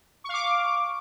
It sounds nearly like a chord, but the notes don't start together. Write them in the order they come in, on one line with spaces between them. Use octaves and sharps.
C#6 F5 D6